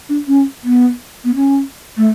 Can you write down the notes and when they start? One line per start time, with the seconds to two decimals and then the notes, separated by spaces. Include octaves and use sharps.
0.09 D4
0.27 C#4
0.63 B3
1.24 B3
1.35 C#4
1.97 A3